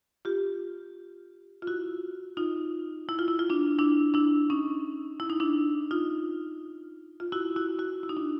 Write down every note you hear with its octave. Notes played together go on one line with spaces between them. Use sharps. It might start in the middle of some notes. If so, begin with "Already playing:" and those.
F4 G4
F4
E4 F#4
D#4 F4
E4
F4
E4
F4
D4 E4
D4 E4
D4 E4
C#4 D#4
E4
D#4
D4 E4
D#4 F4
F4
E4 F#4
E4 F#4
E4 F#4
E4
D#4
D4 E4